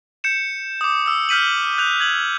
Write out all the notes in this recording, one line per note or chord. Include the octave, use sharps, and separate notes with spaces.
G6 C#7 E7
D6 D#6
D#6 E6
F6 G6 B6 D#7 F#7
F#6 G6 F7
G#6 F#7